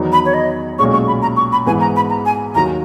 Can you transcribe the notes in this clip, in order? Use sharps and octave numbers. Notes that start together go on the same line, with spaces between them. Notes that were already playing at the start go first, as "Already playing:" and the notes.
Already playing: E2 D#3 F#3 B3 D#4
B5
C#5
D#5
B1 A#2 G#3 C#4 C#6
C#6
B5
A#5
C#6
B5
G#2 E3 B3 G#5
A#5
B5
A#5
G#5
D#2 D#3 F#3 A#5